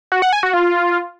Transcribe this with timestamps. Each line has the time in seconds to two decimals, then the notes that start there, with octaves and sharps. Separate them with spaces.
0.12 F#4
0.22 F#5
0.33 G#5
0.43 F#4
0.53 F4